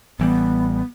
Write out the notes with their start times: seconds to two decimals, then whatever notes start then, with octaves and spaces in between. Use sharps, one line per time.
0.19 A1 E3 G3 B3